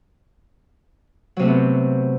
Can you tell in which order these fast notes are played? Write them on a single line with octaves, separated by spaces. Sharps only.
F#3 C3 A3 C4 B3